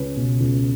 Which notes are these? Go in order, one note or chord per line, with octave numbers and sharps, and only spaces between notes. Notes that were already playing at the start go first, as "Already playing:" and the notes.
Already playing: C#2 C#4 B4
B2
C#2